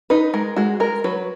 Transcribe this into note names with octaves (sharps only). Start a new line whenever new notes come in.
D#4 B4
G#3 A#4
G#3 F#4
G#3 A#4
F#3 B4